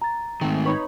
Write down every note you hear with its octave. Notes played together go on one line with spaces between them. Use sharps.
A#5 A6
G#2 D#3 A3 C4
D#4 B4 C#5 B5 C#6